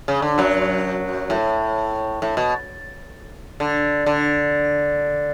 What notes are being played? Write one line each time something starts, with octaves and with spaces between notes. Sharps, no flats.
C#3
D3
F#2 F#3
A2
A2
B2
D3
D3